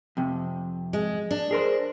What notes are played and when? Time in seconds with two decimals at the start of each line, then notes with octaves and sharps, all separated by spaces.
0.17 F2 C3
0.93 G#3
1.31 D4
1.51 G#4 A#4 C5